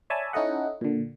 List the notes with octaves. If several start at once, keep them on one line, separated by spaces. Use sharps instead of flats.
C#5 D5 E5 G#5 A5 B5
C#4 D#4 E4 A4 D#5 F#5
A#2 D3